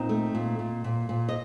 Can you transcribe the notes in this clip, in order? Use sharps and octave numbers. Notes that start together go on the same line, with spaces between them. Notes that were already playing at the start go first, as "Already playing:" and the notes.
Already playing: A#2 C4 D#4
A3
A#2
A#2
A#2
A#2
D#5